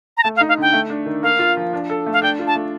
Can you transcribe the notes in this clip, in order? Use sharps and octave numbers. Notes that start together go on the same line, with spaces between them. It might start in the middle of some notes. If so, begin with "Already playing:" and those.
A#5
A3 A5
F5
D#4
F5
D3 G5
A3
D4
D#3
A#3 F5
F4
F3
D4
A4
A3
F5
D4 G5
F4
A5
A3